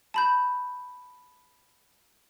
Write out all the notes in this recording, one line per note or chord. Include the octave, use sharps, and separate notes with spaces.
A5 B5 G6